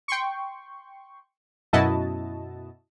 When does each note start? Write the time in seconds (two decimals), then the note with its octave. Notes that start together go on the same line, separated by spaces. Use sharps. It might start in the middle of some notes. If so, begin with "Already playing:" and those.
0.08 G5 C6 C#6
1.73 F#2 B2 E4 F#4 D#5 A5